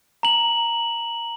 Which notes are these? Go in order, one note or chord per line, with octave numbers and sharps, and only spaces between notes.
A#5 F#7